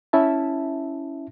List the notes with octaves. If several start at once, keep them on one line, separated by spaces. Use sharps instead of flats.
C#4 E4 E5 A5